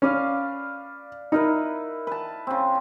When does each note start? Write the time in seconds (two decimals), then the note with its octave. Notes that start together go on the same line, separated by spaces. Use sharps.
0.02 C#4 B4 D5 F5
1.32 D#4 E4 A#4 B4
2.07 B4 A5
2.47 C#3 C4